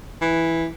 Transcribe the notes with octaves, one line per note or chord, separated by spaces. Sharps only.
E3